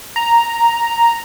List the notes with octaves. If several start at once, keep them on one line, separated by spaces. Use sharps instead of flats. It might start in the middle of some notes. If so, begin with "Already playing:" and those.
A#5